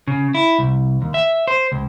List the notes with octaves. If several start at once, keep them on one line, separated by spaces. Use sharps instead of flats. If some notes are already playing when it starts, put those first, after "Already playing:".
C#3
E4
C2
D#2
E5
C5
C#2